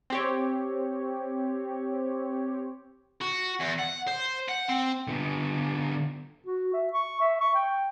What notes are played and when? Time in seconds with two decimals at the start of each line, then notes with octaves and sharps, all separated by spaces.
0.10 C4 G4 C#5
3.21 F#4
3.60 E2
3.79 F#5
4.07 C5
4.49 F#5
4.69 C4
5.08 D3 B3
6.46 F#4
6.74 E5
6.93 C#6
7.21 E5
7.41 C#6
7.55 G5